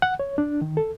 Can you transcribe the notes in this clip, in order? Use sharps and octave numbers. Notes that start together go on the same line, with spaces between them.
F#5
C#5
D4
D#3
A4